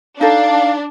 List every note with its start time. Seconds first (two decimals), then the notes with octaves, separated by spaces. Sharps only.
0.21 D4 D#4 A4 F5